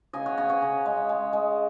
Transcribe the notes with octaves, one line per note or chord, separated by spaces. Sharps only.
C#3 D#5 G#5
C#5 F#5
C#3 D#5 G#5
C#5 F#5
C#3
G#3
G#3
G#3